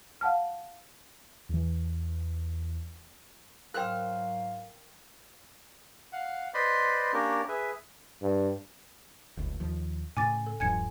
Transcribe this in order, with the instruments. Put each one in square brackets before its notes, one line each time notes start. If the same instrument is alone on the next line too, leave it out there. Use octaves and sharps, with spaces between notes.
[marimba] F5 F#5 A5 F6
[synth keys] E2 E3
[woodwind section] G#2 F#3 F5 [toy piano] A#4 G5 [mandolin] C5 F6 F#6
[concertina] F5 F#5
B4 C5 D5 D#5 B5 C6
A#3 C#4 D4 G4 A#4
G#4 B4 E5
[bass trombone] G2
[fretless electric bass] F1 C#2
D#2 F3
[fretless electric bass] A2 C#3 [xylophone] G#5 D6 A6
[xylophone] A4
[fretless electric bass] D#1 G2 F3 [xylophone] G#5 G#6 C#7